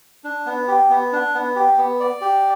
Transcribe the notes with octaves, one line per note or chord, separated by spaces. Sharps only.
D4
B3
G4
B3
D4
B3
G4
B3
D5
G4